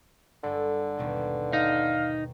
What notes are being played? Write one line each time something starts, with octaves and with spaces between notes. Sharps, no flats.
G1 D3 A4
D#2 B2 B3
D#4 F5